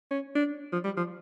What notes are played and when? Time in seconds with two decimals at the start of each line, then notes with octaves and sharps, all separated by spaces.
0.11 C#4
0.35 D4
0.73 F3
0.85 G3
0.97 F3